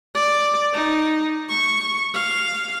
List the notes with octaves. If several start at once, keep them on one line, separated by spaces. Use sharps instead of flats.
D5
D#4
C#6
F5